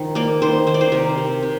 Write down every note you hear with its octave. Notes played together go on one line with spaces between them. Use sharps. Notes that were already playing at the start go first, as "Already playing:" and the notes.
Already playing: D#3 F3
A#3 D5
D#3 C5
D#3 C5
D5
C5
C3 A#4
C3
C3